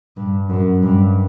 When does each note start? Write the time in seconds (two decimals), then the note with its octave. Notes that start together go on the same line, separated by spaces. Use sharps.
0.17 G2
0.49 F#2
0.82 G2